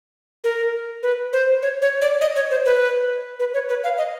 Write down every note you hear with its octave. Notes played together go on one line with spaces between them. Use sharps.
A#4
B4
C5
C#5
C#5
D5
D#5
C#5
C5
B4
B4
C#5
B4
F5
D#5